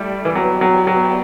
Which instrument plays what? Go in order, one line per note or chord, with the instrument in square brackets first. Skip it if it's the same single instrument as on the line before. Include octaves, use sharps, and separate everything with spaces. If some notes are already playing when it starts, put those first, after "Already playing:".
Already playing: [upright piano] G3 [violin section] A3 E4 G4 D5
[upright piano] E3
[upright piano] F#3 [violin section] B3 E4 G4 D5 G5
[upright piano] F#3
F#3